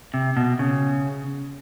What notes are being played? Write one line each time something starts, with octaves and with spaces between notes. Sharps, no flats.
C3
B2
C#3